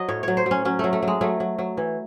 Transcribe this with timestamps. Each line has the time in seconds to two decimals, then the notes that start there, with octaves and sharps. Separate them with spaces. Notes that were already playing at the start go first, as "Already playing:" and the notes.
Already playing: F#3 D#5
0.09 A2 C#5
0.23 F#3 C#5
0.37 C5
0.46 F#3 C#4
0.65 F#3 C#4
0.79 F#3 A3
0.93 A3
1.03 F#3 G#3
1.21 F#3 A3
1.40 F#3
1.59 F#3
1.77 E3